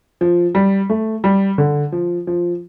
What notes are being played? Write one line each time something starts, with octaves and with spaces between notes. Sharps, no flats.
F3
G3
A3
G3
D3
F3
F3